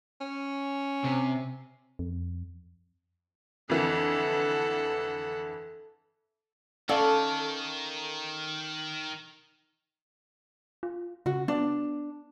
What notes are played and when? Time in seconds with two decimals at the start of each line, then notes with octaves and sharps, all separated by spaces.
0.21 C#4
1.04 C3
1.99 F2
3.70 F2 D3 E3 A4 F#5
6.89 D#3 C#4 A4 D5 F5
10.83 F4
11.26 C#3 F#4
11.48 B3 D4